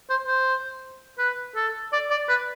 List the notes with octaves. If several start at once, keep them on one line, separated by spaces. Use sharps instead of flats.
C5
C5
B4
A4
D5
D5
B4